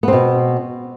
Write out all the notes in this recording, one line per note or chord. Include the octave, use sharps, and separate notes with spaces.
B2 B3 C4